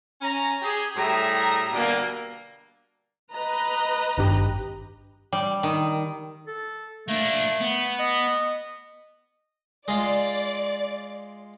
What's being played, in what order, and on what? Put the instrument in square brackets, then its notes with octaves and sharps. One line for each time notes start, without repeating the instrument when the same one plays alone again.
[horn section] C#4 A#5
G4 G#4
A2 G3 G#4 E5 A#5
B2 D3 G3 A#3
[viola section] B4 D#5 A#5
[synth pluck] G#1 G2 G4
[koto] G3
D#3
[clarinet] A4
[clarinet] A3 [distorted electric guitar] A#3 D4
[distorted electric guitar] B3
[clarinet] D#5
[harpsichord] G#3 F4 [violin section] D5